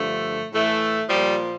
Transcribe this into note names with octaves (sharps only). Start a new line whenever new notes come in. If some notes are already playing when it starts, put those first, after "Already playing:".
Already playing: G2 D3 F3 A3
A2 E3 A3
A#2 F3 G3